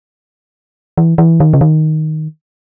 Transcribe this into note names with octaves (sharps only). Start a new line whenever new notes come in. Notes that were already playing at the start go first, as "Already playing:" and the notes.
E3
E3
D#3
C#3
D#3